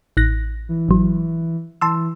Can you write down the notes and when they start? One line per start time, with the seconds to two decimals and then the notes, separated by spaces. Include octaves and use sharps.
0.17 A1 F#6 A#6
0.69 E3
0.89 G#1 F#3
1.81 E3 A5 C6 E6